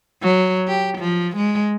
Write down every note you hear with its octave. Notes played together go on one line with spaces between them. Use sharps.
F#3
G4
F3
G#3